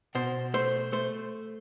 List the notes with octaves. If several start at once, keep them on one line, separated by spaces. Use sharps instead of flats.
B2 C5
A3 C5
A3 C5